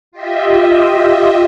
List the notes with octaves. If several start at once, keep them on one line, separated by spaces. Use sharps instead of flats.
F4 G4 D#5 E5